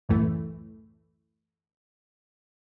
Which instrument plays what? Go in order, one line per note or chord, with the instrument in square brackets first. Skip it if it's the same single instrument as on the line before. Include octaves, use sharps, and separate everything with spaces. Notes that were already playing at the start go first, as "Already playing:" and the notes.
[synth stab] C#2 F#2 A2 E3 A3